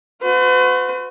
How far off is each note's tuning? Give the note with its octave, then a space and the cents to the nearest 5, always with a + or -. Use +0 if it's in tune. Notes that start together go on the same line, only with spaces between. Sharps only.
F#4 -35 B4 +45